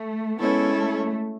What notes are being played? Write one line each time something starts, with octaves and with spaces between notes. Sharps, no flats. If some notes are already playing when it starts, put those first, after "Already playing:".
Already playing: A3
G#3 B3 C#4 E4 A4 C#5
A3